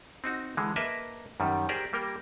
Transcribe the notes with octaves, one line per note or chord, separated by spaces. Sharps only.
C4 D#4 F#4
D3 E3 G#3
A#3 A#4 B4 D#5 E5 A5
F#2 D#3 G3
G4 G#4 A#4 C5 D5
G3 A#3 A#4 G5